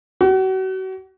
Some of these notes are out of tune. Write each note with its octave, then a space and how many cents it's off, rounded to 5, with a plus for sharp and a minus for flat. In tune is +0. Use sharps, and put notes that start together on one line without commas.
F#4 +35